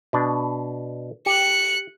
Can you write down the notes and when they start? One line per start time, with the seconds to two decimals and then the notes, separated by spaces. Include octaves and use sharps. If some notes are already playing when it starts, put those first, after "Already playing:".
0.13 B2 D4
1.26 G4 F#6 C#7